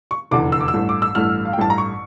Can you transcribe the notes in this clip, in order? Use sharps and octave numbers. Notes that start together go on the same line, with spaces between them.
C#6
F1 E2 D3 D6
E6
D6
E6
A1 G2 E3 A3
D6
E6
A1 G2 E3 A3 F6
F5
G5
A1 G2 E3 A3 A5
A#5
C#6